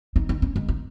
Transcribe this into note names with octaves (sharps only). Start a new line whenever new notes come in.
D#4
D#4
C#4
G#3
D#4